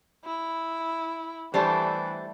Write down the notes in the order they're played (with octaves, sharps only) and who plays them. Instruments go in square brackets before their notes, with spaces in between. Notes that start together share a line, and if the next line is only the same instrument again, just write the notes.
[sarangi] E4
[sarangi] E3 [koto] G3 A3 [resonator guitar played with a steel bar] D4 G4 C5